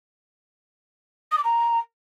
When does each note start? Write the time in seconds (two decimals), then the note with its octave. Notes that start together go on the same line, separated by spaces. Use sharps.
1.31 D#6
1.37 D6
1.43 A#5